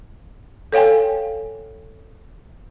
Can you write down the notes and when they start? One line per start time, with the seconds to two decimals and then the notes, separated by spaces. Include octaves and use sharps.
0.72 A4 C#5 F5 G5 G#5